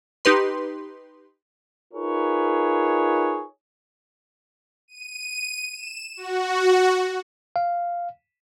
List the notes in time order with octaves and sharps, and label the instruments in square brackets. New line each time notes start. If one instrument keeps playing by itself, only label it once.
[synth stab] D#4 G4 B4 C6
[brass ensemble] D#4 F4 G#4 A#4 B4 C#5
[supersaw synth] D#7
E7
F#4
[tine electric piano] F5